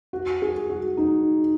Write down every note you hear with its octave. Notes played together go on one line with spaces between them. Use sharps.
F#4
G#4
F#4
D#4